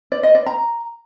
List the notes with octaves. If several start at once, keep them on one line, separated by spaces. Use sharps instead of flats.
D5
D#5
D5
A#5